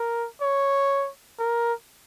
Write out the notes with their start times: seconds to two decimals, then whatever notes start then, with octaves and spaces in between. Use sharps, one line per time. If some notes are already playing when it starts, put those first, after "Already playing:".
Already playing: A#4
0.41 C#5
1.39 A#4